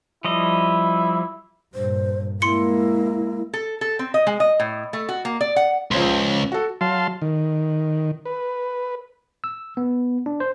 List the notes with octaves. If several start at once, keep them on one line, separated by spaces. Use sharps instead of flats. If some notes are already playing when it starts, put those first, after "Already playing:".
F3 G3 E4 D#5
G2 A#2 C5
G#3 A#3 E4 C6 C#7
A4
A4
C4
D#5
G#3
D#5
A2
A3
F#4
A#3
D5
F#5
C#2 F3 C5 C6
F#4 A4
F#3 F5 A5 C6
D#3
B4
E6
B3
D4
C5